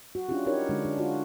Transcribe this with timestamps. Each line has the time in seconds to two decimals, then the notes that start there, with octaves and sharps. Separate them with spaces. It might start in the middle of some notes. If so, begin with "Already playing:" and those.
0.15 F#4
0.29 C#4 D4 E4 F4 G4
0.46 D#4 G4 A#4 C#5
0.69 D3 G#3 D4
0.85 D4
0.98 F4 F#4